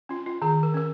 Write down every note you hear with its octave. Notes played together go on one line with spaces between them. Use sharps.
C#4 F4
F4
D#3 G#4
A#4
C#4 A#4